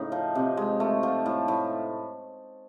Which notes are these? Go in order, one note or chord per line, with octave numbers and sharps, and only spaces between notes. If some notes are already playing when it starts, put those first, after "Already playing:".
Already playing: A2 C#3 D#4
F3
C3
G#3
A3
F3
A2
A2